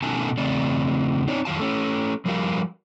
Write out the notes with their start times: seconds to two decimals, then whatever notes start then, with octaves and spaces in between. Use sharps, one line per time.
0.02 B2 D#3 A3 C#4 G#5 A5
0.38 E2 C#3 A3 C4 D5
1.27 C4 D4 D#4 C#5 D5
1.45 F2 D#3 F#3 F5 A5
1.60 A3 C#4
2.25 F3 G3 F#4 A#4 F5